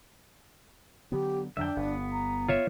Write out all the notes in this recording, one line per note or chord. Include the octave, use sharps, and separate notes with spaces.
D3 F#3 B3 G4
F2 D3 F#3 D4 E5 G5
G1 B3
A#5
F4 C#5 E5